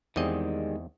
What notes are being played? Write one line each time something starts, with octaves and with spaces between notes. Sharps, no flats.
E2 D#3 G3 G#3 C4 D#5